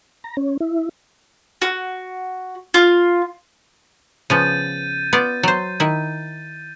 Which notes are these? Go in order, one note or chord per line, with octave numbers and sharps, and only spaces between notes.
A#5
C#4
E4
F#4
F4
C#3 F3 B3 G6 A6 D#7
B3 F4 D5
F#3 C5
D#3 E4